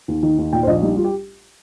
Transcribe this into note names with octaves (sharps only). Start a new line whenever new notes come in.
D#2
D#3
D#2
A#2 G5
C5
A#1 D#5
G3 D#4
G3 F4
G4